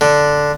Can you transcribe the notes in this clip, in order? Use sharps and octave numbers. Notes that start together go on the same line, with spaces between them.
D3